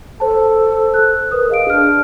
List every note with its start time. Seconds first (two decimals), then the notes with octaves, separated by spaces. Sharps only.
0.20 A4 C5 A5
0.94 F#6
1.31 A#4 B4 D#6
1.50 G#4 D#5 F5 D7
1.70 D4 F6